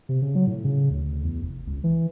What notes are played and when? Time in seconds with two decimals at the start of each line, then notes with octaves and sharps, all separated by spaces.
0.09 C3
0.22 C#3
0.35 F#3
0.47 A2
0.64 C#3
0.90 D2
1.24 E2
1.42 F1
1.67 C#2
1.84 E3